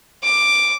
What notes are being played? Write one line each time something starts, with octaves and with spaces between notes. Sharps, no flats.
D6